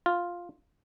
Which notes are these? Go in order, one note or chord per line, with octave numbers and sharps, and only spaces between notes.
F4